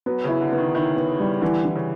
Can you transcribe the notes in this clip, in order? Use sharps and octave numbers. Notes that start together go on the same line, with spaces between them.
F#3 B3
C#3 E4
D3
B3
D#3
D#3 E4
B3
G3
D3 E3
E3
C#3